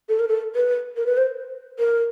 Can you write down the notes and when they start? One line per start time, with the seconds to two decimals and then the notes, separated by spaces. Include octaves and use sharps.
0.09 A4
0.19 A#4
0.28 A4
0.55 B4
0.97 A#4
1.06 B4
1.17 C5
1.79 A#4